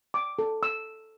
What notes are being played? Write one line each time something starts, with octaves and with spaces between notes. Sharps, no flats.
D6
A4
E6